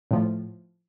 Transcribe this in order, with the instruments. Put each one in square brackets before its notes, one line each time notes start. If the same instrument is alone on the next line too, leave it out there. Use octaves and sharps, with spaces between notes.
[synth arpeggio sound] A2 F3